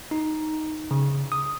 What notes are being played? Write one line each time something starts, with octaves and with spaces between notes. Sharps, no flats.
D#4
C#3
D#6